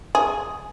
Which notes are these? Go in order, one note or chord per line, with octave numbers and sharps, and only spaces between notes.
G#4